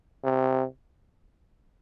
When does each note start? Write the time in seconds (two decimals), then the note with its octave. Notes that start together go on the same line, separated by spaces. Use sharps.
0.24 C3